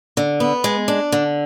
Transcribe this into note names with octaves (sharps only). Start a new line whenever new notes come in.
D3
B3
G#3
D4
D3